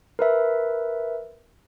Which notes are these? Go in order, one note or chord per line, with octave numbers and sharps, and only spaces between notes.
A#4 B4 E5